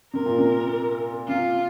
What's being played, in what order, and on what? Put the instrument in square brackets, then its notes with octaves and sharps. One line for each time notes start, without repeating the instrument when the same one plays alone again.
[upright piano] C3 [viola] A#4
[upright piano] A#2
C3
[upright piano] C3 [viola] F4